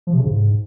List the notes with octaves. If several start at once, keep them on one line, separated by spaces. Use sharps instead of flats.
F3
C3
C#3
G#2